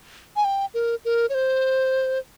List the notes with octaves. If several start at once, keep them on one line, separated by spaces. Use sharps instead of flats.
G#5
G5
A#4
A#4
C#5
C5